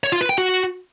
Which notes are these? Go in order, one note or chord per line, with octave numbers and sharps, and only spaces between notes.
C#5
F4
B4
G5
F#4